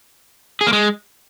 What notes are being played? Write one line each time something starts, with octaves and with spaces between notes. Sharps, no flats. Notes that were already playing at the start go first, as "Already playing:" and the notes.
G#4
A#3
G#3